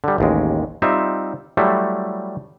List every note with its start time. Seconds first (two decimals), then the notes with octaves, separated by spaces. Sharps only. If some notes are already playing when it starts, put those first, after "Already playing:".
0.04 D3 G3
0.18 A1 D#2 G#3
0.82 G3 C4 D#4 F4 E5
1.57 F#3 G3 A3 E4 C5